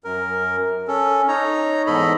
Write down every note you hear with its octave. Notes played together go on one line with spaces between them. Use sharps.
F#2 A#4
C#4 A4
D#4 C#5 A#5
E2 G#2 A4 D#5 B5